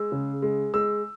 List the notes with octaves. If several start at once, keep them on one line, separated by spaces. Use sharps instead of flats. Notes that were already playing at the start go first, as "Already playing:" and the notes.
Already playing: G#3 E6
C#3
G#3
G#3 E6